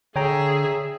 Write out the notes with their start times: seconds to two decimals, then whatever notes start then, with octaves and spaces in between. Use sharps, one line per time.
0.16 D3 G#4 C#5 E5 G5 A#5